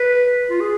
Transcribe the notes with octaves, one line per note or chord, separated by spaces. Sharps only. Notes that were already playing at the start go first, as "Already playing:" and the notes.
Already playing: B4
F4
G#4